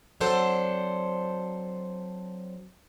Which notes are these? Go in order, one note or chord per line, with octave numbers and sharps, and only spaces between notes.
F#3 C4 D4 A4 C5